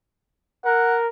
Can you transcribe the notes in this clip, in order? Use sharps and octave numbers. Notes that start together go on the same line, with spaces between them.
A#4 F#5